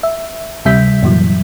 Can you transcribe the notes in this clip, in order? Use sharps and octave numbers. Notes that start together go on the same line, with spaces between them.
E5
D2 C3 G3 E5 G6 B6
F#2 A#2 E3 F#3